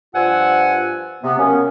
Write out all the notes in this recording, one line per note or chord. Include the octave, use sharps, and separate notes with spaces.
G2 F3 F4 F#5 G#5 E6
C3 B3
F#3 A#3 B3 C#4